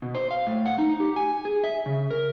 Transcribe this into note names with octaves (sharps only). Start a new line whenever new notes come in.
B2
C5
F5
A2
F#5
D#4
G4
G#5
G#4
E5
C#3
A#4